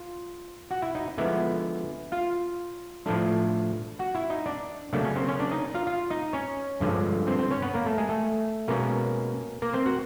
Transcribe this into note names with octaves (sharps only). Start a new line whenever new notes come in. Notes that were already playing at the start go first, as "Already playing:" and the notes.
Already playing: F4
F#4 F#5
E4 E5
D#4 D#5
D3 F3 G#3 B3 E4 E5
F4 F5
A2 F3 A3 D4
F#4 F#5
E4 E5
D#4 D#5
D4 D5
C#3 F#3 A3 A#3 D4 A4
C#4 C#5
C4 C5
C#4 C#5
D4 D5
D#4 D#5
F4 F5
F4 F5
D#4 D#5
C#4 C#5
G2 D3 F3 G#3
C4 C5
C4 C5
C#4 C#5
B3 B4
A#3 A#4
A3 A4
G#3 G#4
A3 A4
B2 G#3 A#3 C#4 A#4
A#3 A#4
C4 C5
F#4 F#5